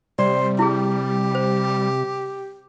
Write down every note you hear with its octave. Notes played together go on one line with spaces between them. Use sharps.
C3 G3 C5 D5
E4 G4 G#4
C5